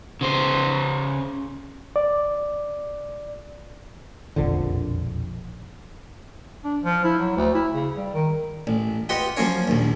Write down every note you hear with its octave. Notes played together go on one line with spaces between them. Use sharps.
C#3 C5
D5
E1 A#1 F2 D3
D4
F3
E4
F#3
D2
E4
C#3
G3
D#3
A1
F4 G4 B4 D#5 F#5
F3 F#3 A#3 C#4 A#4 C#5
A#1 D#2